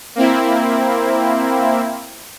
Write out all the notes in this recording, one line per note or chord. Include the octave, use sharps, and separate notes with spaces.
A#3 C4 E4